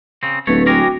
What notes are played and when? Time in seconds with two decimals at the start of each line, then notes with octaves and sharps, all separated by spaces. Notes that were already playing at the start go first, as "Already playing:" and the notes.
0.23 C#3 C4
0.47 D1 A3 B4 C#5
0.66 G#3 C#4 F#4 A#4 G5 D6